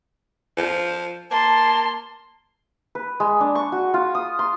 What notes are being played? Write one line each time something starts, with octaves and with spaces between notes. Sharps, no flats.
F3
A#3 A5 C6
B4
G#3
D4
C#6
F#4
F4
D#6
C6